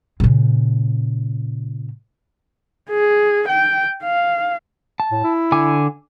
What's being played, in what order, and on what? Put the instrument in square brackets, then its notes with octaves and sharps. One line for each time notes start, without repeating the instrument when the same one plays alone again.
[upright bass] A#2 C#3
[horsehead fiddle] G#4
G5
F5
[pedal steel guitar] A5
[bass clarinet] A2
E4
[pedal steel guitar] D3 G#5 D6